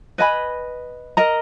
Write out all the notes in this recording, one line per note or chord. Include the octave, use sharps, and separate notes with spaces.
B4 D#5 G#5 B5
A#4 D#5 A#5